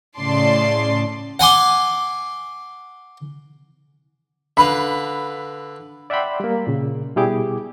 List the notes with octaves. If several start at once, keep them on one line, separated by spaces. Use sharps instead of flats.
A2 C#3 D5 A5 C6 C7
F#5 G#5 C6 D6
D3 B4 F5 B5
D5 E5 F#5 G5 B5 C6
G3 A#3
A#2 C#3
B2 G3 E4 G4 G#4 D6